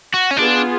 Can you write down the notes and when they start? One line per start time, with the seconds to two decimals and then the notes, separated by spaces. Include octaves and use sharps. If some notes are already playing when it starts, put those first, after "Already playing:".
0.14 F#4
0.31 C#4
0.37 B3 D4 F4 G#4